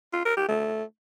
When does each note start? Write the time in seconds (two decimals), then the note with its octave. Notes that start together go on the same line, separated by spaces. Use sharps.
0.13 F4
0.25 A#4
0.37 G4
0.49 A3